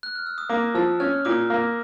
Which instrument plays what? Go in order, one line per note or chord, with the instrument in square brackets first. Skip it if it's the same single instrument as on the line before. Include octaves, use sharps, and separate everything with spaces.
[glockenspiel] F#6
F6
E6
D#6
[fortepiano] A#3 [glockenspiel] D6
[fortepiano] F3 [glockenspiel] E6
[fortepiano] C#4 [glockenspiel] F6
[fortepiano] A#2 [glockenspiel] D6
[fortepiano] A#3